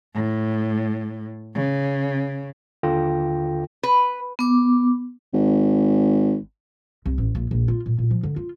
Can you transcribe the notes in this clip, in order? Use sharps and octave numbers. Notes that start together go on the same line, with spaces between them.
A2
C#3
D#2 D3 F4 A4 G5 A#6
B4
B3 D6
G#1
C2
A1
A#1
A#1
F4
A#2
A#2
F3
D3
F4